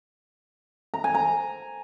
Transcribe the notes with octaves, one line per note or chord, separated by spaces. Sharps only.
A#5
G#5
A#5